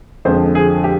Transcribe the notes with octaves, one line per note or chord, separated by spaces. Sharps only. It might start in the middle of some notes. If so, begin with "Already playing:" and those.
F2 D3 F3 G#3 C5
G#4
G4